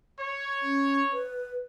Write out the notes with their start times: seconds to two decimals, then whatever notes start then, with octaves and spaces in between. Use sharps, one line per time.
0.20 C#5
0.62 C#4
1.13 B4